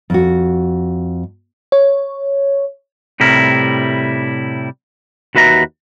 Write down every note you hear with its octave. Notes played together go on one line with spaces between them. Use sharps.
F2 F#4
C#5
A2 C3 G3 E4 A#4
D#2 F#4 B4 E5 A#5